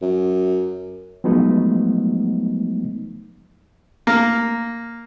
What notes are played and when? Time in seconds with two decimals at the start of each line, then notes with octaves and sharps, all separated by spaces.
0.02 F#2
1.24 F3 F#3 G#3 A3 B3 D#4
4.07 A#3